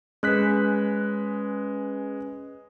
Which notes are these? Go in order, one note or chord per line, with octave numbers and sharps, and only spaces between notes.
G#3 C#4 B4 F#6 B6